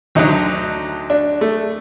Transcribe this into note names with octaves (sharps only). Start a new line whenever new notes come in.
D2 D3 F#3 D#4
D4
A3